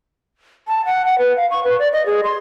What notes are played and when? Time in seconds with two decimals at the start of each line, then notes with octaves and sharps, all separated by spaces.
0.68 A5
0.85 F#5
1.06 F#5
1.19 B4
1.36 F5
1.51 C#6
1.64 B4
1.79 D5
1.93 D#5
2.06 G#4
2.23 C6